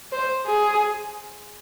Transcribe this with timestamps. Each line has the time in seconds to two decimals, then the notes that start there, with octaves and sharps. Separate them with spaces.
0.12 C5
0.46 G#4